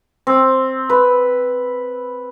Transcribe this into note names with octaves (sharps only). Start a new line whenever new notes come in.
C4
B4